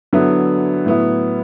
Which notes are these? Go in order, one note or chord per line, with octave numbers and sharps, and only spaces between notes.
D3 F#3 B3 E4
A2 F#3 B3 E4